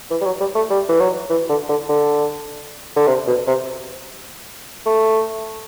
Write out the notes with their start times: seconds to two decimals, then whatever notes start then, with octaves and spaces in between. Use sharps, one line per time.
0.11 E3
0.21 G3
0.26 F#3
0.40 G3
0.55 A3
0.70 G3
0.89 E3
1.00 F#3
1.30 E3
1.49 D3
1.69 D3
1.89 D3
2.97 D3
3.07 C3
3.27 B2
3.47 C3
4.86 A3